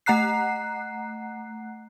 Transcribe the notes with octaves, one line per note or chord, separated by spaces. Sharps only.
A3 F#5 A#5 F#6 C7